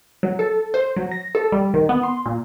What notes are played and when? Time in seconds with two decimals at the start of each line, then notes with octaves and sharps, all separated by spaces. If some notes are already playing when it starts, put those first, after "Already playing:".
0.23 F#3
0.39 A4
0.74 C5
0.97 F#3
1.12 A#6
1.35 A4
1.52 G3
1.74 D#3
1.89 B3
2.03 C6
2.26 A#2